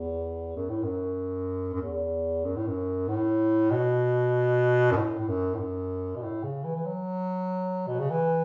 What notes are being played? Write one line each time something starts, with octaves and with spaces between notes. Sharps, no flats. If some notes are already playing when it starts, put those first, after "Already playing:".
Already playing: E2
F#2
A2
F#2
F#2
E2
F#2
A2
F#2
A2
B2
F#2
A2
A2
F#2
A2
F#2
B2
A2
C#3
E3
E3
F#3
B2
C#3
E3